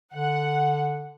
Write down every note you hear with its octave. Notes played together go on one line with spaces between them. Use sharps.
D3 F#5